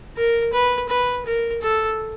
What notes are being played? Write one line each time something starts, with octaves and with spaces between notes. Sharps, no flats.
A#4
B4
B4
A#4
A4